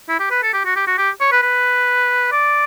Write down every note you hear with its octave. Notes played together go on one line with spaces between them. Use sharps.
E4
G4
B4
A4
G4
F#4
G4
F#4
G4
C#5
B4
B4
D5